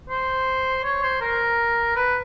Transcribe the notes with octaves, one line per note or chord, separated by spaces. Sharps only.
C5
C#5
C5
A#4
B4